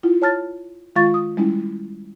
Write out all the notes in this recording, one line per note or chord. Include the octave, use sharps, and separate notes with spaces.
E4 F4
C#5 A5 F6 A6
D#3 G#3 F4 F5 C#6 A6
D#6
G3 G#3 C#4 E4